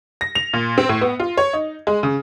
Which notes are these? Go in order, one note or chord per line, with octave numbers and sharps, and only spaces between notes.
A#6
F7
A#2
C4
A2
B3
F4
C#5
D#4
G#3
C#3